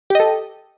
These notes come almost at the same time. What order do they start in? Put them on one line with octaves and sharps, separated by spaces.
G4 D#5 A4